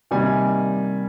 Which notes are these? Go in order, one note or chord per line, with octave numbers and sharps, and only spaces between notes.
C3 D#3 G3 A#3 G#5